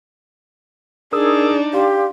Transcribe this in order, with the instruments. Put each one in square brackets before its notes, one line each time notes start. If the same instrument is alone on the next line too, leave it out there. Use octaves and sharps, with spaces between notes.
[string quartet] D4 D#4 [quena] G#4 [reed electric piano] A#4 D#6 E6
[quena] G4 [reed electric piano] D5 F5 C6